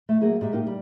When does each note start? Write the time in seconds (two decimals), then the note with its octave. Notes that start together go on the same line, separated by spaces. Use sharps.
0.09 A3
0.21 F#3 A#3 G#4 E5
0.41 G#2 G4 E5
0.53 A#3 D#4 G4
0.67 G3